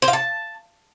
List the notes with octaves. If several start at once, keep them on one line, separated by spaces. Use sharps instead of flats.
C5
F5
A5